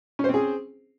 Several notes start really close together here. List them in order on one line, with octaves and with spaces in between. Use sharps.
C#4 C5 C4 G#4